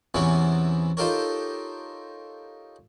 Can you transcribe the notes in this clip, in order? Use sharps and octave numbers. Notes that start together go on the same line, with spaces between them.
E2 C3 E3 B3 C#4 G#5
D#4 F4 G4 A4 A#4 C#5